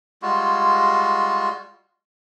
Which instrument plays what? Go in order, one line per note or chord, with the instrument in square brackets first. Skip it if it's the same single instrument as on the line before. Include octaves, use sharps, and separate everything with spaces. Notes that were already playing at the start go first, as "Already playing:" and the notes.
[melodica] G3 G#3 F4 F#4